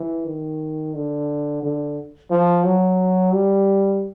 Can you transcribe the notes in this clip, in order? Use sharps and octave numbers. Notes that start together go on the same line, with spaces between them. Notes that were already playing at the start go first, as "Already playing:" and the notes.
Already playing: E3
D#3
D3
D3
F3
F#3
G3